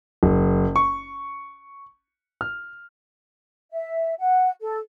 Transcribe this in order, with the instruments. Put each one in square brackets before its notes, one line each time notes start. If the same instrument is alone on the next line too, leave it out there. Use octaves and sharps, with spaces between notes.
[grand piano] F#1
C#6
F6
[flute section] E5
F#5
A4